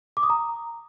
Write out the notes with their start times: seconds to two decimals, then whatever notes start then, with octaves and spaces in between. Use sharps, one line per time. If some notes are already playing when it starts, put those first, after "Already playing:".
0.17 D6
0.23 D#6
0.30 A#5